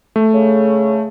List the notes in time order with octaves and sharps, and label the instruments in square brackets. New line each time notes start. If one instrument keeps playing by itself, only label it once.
[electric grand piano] A3
[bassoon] C#3